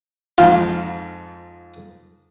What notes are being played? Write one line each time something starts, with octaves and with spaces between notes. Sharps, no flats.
F2 G#2 F4 F5